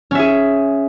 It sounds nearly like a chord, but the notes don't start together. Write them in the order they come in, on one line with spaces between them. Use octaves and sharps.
C#4 E5 G#4